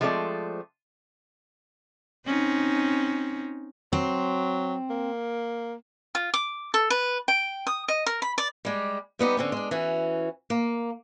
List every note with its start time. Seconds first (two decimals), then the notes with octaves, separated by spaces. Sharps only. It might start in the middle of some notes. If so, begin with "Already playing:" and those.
0.01 F3 G#3 A3 C4 D5
2.26 C4 C#4 D#4
3.93 F#3 C4
4.90 A#3
6.15 F4
6.34 D6
6.74 A4
6.90 B4
7.28 G5
7.67 D#6
7.88 D#5
8.06 A#4
8.22 B5
8.38 D5
8.65 G3 G#3 G4
9.19 G3 B3 D#4 G4
9.37 D3 C4 C#4
9.52 G#3 D4
9.71 E3 C#4 F#4
10.50 A#3